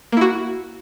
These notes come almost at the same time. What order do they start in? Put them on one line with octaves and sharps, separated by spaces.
A#3 E4 F#4